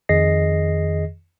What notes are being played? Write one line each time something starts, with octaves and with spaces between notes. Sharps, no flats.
F2 D#3 G#4 D#5 A#6 C7